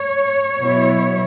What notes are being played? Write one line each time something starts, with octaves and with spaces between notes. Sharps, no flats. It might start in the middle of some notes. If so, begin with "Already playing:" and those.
Already playing: C#5
B2 F#3 B3 E4